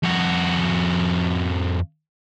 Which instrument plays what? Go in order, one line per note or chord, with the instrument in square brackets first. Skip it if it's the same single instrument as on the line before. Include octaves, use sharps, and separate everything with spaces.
[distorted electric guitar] F2 F#4